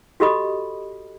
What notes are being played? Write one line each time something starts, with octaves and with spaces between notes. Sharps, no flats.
F#4 G4 A4 D#5 B5 D#6